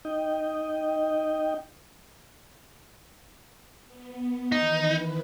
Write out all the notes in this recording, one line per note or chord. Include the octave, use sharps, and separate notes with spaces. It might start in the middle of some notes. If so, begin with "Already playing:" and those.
D#4 D#5 G5
B3
D#3 E3 D#4 B4